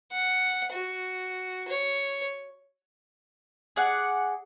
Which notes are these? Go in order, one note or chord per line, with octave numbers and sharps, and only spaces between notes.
F#5
F#4
C#5
G#4 D5 F#5